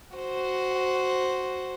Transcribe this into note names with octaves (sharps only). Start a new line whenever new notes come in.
F#4 C5